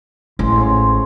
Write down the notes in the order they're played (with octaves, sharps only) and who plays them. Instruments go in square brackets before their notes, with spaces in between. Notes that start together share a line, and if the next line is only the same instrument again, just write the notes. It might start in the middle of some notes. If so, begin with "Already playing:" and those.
[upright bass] A1 [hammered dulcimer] G#3 C6
[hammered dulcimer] C5 C#5